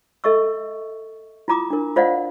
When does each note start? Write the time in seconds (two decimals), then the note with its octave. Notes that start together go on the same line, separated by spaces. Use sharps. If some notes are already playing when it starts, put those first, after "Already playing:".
0.24 A4 D#5 E5 C#6 E6
1.48 E4 F4 A#5 D6 D#6
1.70 D4 E4 A#4
1.96 F4 C5 D5 D#5 F5 F#5